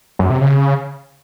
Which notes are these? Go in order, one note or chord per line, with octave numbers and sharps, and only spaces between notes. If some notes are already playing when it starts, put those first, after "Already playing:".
F#2
C3
C#3